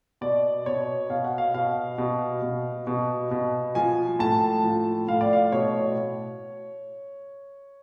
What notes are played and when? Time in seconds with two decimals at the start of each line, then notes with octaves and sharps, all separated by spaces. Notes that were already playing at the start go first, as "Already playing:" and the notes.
0.21 B2 D5
0.66 B2 C#5
1.10 B2 F5
1.24 F#5
1.38 F5
1.54 B2 F5
1.98 B2
2.42 B2
2.87 B2
3.31 B2
3.75 F3 G#5
4.19 A2 A5
4.64 F3
5.08 A2 F5
5.21 D5
5.33 F5
5.52 B2 C#5